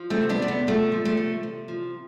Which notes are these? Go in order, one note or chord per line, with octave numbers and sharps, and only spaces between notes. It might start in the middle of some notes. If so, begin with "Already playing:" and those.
Already playing: F3
A3 C4
C3
B3 D4
C3 A3
B3
F3 A3
F3
A3
C3
C3
F3